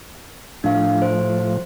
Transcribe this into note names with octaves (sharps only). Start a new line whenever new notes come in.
A2 F3 D4 F5
C5